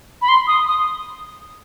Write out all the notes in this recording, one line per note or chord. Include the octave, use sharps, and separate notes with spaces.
B5
C6
D#6
D#6